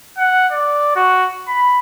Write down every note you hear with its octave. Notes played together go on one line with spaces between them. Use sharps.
F#5
D5
F#4
B5